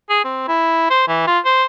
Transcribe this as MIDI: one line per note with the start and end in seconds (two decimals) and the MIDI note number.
0.10 0.21 68
0.25 0.46 60
0.48 0.89 64
0.90 1.04 72
1.08 1.24 52
1.27 1.39 65
1.45 1.65 72